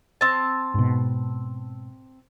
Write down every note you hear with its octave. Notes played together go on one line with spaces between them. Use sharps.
C4 A5
G#2 B2